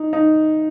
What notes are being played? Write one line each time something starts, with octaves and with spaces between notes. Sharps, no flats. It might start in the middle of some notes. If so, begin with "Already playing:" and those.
Already playing: D#4
D#4